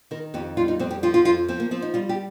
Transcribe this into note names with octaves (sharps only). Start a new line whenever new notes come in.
D#3 A#4
F2 G4
G3 F4
D#4
F2 C4
G4
F3 F4
F4
F2 F4
F3 C4
A#3
F3 C4
D#4
G3 F4
G4